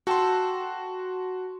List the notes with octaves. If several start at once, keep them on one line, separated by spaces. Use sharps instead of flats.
F#4 A4 G5 A5 C6